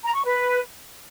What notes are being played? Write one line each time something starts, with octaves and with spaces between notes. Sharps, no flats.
A#5
C#6
B4